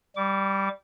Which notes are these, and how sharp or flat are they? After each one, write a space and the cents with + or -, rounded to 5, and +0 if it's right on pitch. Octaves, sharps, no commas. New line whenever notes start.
G3 +0 D6 -35